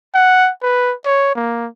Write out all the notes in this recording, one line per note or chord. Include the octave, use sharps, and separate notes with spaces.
F#5
B4
C#5
A#3